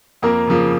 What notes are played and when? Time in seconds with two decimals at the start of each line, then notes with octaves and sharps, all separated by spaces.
0.22 F2 A#3 A#4
0.48 C#3 F3 A#3